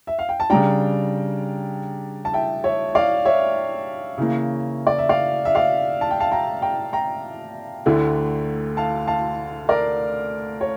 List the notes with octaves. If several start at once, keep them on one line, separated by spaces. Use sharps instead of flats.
E5
F5
G5
A5
C#3 G3 D4 G5 A#5
A5
E5 G5
C#5 E5
D5 F5
C#5 E5
C#3 E3 A#3
D5
E5
D5 F5
E5
D5 F5
A5
G5
F5 A5
G5 A#5
G5 A#5
G5 A#5
D2 D3 A3 E4
F5 A5
F5 A5
A#4 D5
C#5